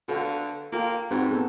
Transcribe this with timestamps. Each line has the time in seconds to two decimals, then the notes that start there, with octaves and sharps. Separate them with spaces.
0.08 D3 F#4 B4 F5
0.73 A#3 F4 A4 G5
1.11 G#2 C4 F#4 B4
1.31 B3 G#4 A4